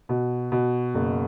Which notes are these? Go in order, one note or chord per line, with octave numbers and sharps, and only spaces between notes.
B2
B2
F#1